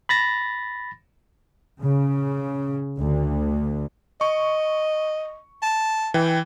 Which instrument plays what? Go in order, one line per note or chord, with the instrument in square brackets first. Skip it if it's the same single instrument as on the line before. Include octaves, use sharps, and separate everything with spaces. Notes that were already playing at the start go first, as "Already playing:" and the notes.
[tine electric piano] B5 A6 A#6
[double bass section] C#3
D2
[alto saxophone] D#5 [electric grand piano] C#6
[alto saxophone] A5
[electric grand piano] E3 G5